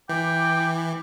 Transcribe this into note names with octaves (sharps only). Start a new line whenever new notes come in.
E3 G5 D6